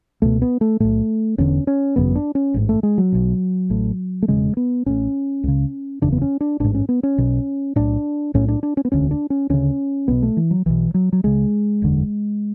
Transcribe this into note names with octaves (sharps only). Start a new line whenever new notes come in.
C#2 B2 A3
B3
A3
B1 A2 A3
E1 E2 D3 C#4
C#4
G#1 F#2 C#3 B3
D4
C#4
A1 G#2
A3
G#3
F#3
B1 B2
A1 A2
A3
E1 E2 C#3 G#3
B3
A1 A2 C#4
C#2 C#3
F#1 E2 C#3 D4
B3
C#4
D4
A1 G#2 D4
C#4
B3
C#4
B1 B2
B1 A2 D4
B1 A2 C#4
D4
D4
C#4
B3
E1 D2 D3 C#4
D4
C#4
D2 C#3 C#4
B1 B2 B3
A3
E3
F#3
B1 B2 E3
F#3
F#3
C#2 C#3 G#3
F#1 E2 D3